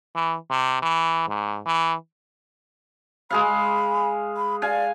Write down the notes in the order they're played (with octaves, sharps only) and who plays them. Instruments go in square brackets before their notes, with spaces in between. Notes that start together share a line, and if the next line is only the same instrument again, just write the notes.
[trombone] E3
C3
E3
G#2
E3
[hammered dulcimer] G#3 G#4 F5 [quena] B5
[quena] B5
[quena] D5 [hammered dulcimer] F5 G#5